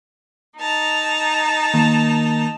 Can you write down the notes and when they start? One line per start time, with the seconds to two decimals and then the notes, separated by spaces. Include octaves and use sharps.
0.58 D#4 A5 A#5
1.74 D#3 A#3